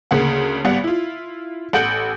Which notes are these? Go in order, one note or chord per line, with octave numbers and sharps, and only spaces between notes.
D2 C#3 A#3 F#5
G#1 G3 B3 F#5
E4 F4
A1 A4 F#5 G6 D7 F#7